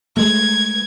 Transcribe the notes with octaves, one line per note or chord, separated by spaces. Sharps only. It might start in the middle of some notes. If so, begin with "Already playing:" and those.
G#3 A3 G#6